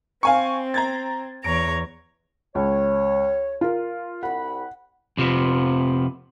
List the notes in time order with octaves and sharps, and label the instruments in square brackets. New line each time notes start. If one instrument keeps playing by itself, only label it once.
[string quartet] C4 [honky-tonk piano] F5 G#5 C#6
[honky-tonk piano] A#5 G#6 A6
[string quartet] E2 C#5 A#5 [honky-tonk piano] D7
[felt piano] C#2 [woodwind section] C#5
[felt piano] F4 A#4
[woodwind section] C2 B5 [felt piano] F#5
[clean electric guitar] F2 C3 F3 B3